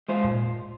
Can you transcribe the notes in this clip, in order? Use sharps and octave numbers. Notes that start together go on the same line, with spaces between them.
G#3 F4 C5
A#2